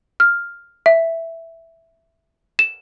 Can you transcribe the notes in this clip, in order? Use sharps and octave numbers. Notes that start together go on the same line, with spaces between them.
F6
E5
E7